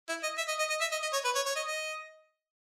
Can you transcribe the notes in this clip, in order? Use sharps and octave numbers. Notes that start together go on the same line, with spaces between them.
E4
D#5
E5
D#5
D#5
D#5
E5
D#5
D#5
C#5
B4
C#5
C#5
D#5
D#5